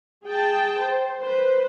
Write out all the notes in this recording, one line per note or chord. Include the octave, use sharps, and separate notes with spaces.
G#4 G5 A5
C5
B4 C5